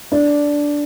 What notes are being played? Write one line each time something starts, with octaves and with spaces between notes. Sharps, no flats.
D4